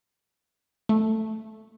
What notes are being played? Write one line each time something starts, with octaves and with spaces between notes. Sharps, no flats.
A3